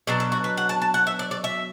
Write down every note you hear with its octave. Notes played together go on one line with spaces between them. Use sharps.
B2 F#3 D4 D5
A4
F#4
B4
F#5
A5
A5
F#5
E5
D5
D5
E5